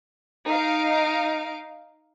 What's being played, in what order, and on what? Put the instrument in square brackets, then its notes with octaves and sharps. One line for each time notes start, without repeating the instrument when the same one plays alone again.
[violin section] D#4 F5 D7